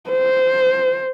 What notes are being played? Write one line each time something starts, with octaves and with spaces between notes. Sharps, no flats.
C5